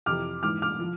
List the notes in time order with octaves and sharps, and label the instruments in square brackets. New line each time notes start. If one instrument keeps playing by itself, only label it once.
[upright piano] F2 C3 E3 D6 F6
G#2 E3 D6 F6
D6 F6
F3